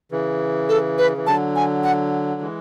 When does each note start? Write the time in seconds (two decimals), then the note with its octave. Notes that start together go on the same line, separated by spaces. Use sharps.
0.12 C#3 E3
0.69 A4
0.98 B4
1.17 E3
1.26 D3 F#3 A5
1.56 G#5
1.84 F#5
2.41 E3 G#3